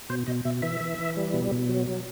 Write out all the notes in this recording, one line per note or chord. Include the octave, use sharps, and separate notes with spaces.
B2 C5
B2 D#5
B2 E5
E3 E5
E3
E3
G3
B2
B2
F#3
F#3